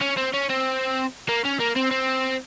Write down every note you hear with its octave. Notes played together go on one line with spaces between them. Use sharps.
C#4
C4
C#4
C4
A#3
C#4
A#3
C4
C4